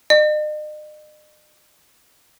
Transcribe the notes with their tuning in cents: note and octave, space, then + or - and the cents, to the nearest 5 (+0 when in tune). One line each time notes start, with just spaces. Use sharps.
D#5 -45